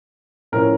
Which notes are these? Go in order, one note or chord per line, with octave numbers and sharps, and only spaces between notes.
A2 F3 C#4 A#4